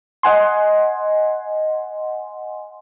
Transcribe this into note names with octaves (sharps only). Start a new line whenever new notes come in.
D#5 F#5 G#5 C6